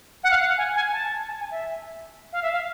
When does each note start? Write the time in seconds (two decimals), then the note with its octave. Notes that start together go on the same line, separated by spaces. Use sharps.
0.24 F#5
0.31 F5
0.38 F#5
0.58 G#5
0.75 G#5
0.93 A5
1.28 A5
1.40 G#5
1.51 E5
2.33 F5
2.43 E5
2.52 F5